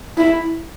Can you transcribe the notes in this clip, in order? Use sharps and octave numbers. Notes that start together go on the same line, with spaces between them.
E4